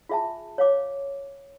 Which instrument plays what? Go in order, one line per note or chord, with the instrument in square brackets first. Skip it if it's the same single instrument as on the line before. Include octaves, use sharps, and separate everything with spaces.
[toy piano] F4 G#4 E5 G#5 A5
C#5 F5 D6